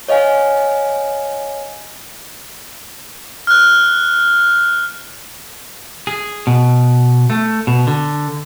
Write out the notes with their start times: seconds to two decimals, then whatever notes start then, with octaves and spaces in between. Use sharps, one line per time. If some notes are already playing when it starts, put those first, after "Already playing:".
0.08 C#5 D#5 F5 G#5
3.47 F6 F#6
6.07 G#4
6.47 B2
7.30 A3
7.67 B2
7.87 D3